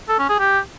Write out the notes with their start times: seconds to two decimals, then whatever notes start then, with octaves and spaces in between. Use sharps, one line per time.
0.09 A4
0.19 C#4
0.29 G#4
0.39 G4